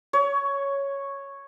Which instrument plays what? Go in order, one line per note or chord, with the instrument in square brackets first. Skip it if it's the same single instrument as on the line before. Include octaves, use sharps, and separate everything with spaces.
[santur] C#5